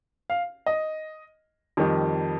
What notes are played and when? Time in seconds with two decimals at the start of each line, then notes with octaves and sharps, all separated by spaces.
0.30 F5
0.66 D#5
1.77 F2 D#3 G3